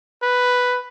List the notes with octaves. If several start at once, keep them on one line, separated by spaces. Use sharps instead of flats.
B4